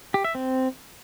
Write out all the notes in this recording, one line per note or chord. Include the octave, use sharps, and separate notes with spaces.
G4
E5
C4